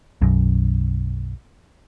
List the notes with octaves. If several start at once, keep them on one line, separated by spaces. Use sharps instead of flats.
B1 F#2